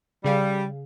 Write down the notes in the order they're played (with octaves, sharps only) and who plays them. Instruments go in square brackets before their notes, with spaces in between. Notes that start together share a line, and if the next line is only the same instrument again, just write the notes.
[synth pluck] C#3 G#4 F5 [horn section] G3